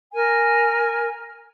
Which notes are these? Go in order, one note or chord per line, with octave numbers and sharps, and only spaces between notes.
A#4 G#5